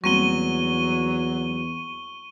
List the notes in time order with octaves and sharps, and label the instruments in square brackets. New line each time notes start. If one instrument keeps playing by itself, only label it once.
[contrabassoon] E2 [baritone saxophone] F#3 [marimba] G3 A#3 C4 [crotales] C#6 D#7 G7